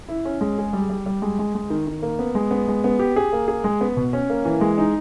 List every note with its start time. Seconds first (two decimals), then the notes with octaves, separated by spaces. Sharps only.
0.09 E4
0.25 C#4
0.41 G#3
0.58 G#4
0.73 G3
0.90 G3
1.06 G3
1.22 G#3
1.39 G#3
1.55 G#3
1.70 D#3
1.87 D#3
2.02 A#3
2.19 B3
2.35 G#3
2.51 B3
2.68 G#3
2.84 B3
2.99 G4
3.16 G#4
3.33 A#3
3.48 G#4
3.64 G#3
3.81 B3
3.97 B2
4.13 C#4
4.30 A#3
4.45 E3
4.61 G#3
4.78 D#4